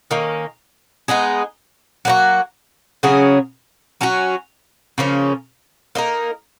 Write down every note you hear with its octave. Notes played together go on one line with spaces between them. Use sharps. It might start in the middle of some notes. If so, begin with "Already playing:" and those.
D#3 A#3 C#4
G#3 B3 D#4 G#4
F#3 A#3 D#4 F#4
C#3 F#3 C#4 G#4
F#3 C#4 F#4
C#3 F3 A#3 C#4
A#3 D#4 A#4